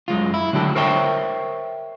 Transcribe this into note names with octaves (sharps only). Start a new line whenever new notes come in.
F#2 G#3 F4
E4
D2 D3 F#3 G4 A4
A#4 C5 C#5 E5 G5